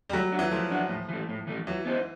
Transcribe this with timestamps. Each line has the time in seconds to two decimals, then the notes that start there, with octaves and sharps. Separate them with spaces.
0.09 G3
0.13 F#3 A3
0.32 D4 F#4
0.39 E3
0.51 F3 A3
0.71 D4 F#4
0.89 A2
1.08 E3 A3
1.29 A2
1.47 E3 A3
1.67 E3 F#3
1.85 B3 D#4 G4 C5